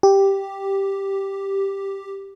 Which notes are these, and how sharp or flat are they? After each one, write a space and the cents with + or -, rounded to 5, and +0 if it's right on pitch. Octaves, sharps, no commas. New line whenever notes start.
G4 +0